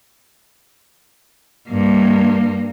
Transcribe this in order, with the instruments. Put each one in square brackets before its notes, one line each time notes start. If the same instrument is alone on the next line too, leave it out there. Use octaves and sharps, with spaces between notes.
[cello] G2 A#3